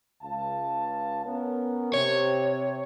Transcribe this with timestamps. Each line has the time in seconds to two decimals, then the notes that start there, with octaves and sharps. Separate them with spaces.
0.22 C#2 F5 A5
1.26 B3 C#4 A#4
1.94 C3 C#5